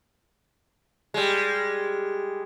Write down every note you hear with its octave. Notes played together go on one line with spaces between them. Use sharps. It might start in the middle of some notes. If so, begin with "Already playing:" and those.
G3 G#3